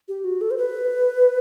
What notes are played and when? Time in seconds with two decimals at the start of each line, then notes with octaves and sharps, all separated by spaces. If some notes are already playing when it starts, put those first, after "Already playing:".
0.08 G4
0.24 F#4
0.41 A4
0.51 C5
0.58 B4